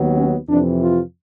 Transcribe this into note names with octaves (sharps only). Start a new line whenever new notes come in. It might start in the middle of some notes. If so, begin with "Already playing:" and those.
Already playing: D#2 D#3 F#3 B3
C#4
F2 C3 E3 D4
F4